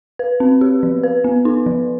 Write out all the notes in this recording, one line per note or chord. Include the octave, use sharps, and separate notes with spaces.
B4
C4
G4
F3
B4
B3
D#4
F3